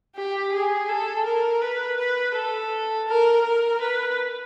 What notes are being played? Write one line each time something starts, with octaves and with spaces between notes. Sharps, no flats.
G4
G#4
A4
A#4
B4
B4
A4
A#4
A#4
B4